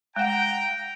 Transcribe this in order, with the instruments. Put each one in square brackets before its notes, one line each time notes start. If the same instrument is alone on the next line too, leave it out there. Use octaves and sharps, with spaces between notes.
[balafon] G#3 F#5 [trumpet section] G5 [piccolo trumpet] A#5